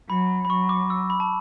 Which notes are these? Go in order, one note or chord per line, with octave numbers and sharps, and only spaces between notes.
F#3 B5
B5
F#3 C#6
D6
E6
B5
A5